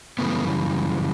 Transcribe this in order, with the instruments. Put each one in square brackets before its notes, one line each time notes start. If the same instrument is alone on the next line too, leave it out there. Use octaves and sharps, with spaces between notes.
[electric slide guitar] F#2 C#3 E3 G3 A3 B3